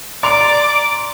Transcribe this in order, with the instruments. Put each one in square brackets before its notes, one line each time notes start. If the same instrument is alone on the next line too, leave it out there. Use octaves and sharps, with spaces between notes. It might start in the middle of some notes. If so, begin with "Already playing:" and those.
[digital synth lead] D5 [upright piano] A#5 C6 F7 [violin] D6